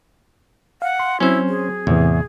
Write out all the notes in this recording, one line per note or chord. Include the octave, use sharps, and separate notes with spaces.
F5 F#5
C6
F#3 C4 C#4 E4 C5
G#4
E2 A2 C3 E3